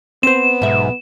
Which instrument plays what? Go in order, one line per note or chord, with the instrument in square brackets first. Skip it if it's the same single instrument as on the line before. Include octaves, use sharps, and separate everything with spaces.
[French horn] B3 [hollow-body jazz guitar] C4 C5 [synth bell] E7
[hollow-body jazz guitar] B1 E5 [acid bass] G#2